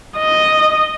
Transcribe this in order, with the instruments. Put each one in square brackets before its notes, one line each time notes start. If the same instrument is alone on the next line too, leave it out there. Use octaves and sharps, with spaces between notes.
[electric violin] D#5